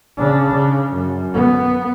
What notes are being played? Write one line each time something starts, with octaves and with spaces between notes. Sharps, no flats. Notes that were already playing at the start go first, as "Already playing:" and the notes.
C#3 D4
C#3
F#2
B3